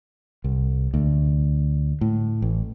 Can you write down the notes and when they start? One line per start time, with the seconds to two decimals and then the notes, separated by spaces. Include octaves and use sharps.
0.44 C2
0.94 D2
2.01 A2
2.42 A1